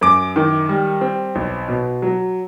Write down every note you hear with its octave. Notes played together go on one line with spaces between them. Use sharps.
F#2 D6
D#3
G3
C4
B1
B2
F#3